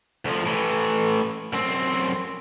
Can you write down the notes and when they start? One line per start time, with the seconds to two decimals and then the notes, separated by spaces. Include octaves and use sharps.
0.25 D2 F3
0.46 A2 E3
1.53 F#2 C4